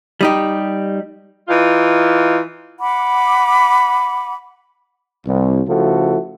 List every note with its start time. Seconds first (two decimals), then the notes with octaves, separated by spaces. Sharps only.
0.21 G3 D#4 G4
1.48 E3 D#4 F4
2.81 F#5 B5 D6
5.26 C2
5.67 C#3 F3 A3 E4 F#4 A4